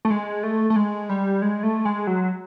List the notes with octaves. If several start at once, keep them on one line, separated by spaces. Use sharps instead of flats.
A3
G#3
A3
A3
G#3
G3
G#3
A3
G#3
F#3